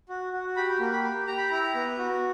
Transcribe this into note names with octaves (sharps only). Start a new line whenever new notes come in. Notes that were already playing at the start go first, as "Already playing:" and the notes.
F#4
F#4
G4 B5
A#3
B5
G4
G4 A#5
B5
E4 A#5
B3
F#4